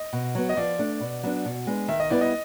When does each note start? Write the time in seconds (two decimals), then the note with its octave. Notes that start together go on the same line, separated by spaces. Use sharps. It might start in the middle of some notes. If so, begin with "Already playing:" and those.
Already playing: D#5
0.13 B2
0.35 F#3 B3
0.49 D#5
0.57 F3 D5
0.79 A3 D4
1.00 B2
1.23 F#3 B3 D4
1.45 B2
1.67 G#3 B3 D4
1.88 D#3 E5
2.00 D#5
2.10 G3 B3 E4 D5
2.21 D#5